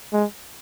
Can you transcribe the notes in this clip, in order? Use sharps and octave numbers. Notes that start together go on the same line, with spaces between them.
G#3